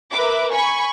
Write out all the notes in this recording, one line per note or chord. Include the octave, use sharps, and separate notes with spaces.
A#4 B4 E5 D6
G#5 B5 C#6